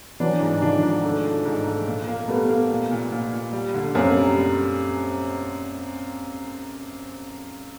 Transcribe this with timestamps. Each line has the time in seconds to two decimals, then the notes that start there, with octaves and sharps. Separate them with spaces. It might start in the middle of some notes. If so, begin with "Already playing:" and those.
0.20 E3 F#3 D4
0.41 G#2
0.62 D#3 F3 D4
0.83 G#2
1.03 A3
1.24 D4
1.46 G#2
1.66 A3
1.86 A#2
2.08 A#3
2.28 G3 A3 B3
2.50 A#3
2.70 A#2
2.91 A#2
3.12 A#2
3.33 A#2
3.53 G3
3.74 D3
3.94 F#2 A#3 C4
4.16 G3
4.36 G3